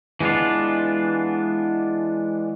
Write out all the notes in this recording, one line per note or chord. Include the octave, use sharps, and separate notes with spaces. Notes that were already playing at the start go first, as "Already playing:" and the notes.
E3 G#3 B3 D4 F4